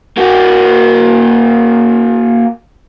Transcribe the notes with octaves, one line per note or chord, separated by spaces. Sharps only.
A#3 F#4